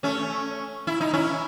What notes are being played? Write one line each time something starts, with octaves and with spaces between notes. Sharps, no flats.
A3 C#4
E4
D#4
C#4 E4